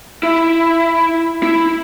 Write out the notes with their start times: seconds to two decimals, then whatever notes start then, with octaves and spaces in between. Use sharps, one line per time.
0.23 E4
1.43 E4